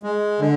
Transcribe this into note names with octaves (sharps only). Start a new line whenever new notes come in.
G#3
D3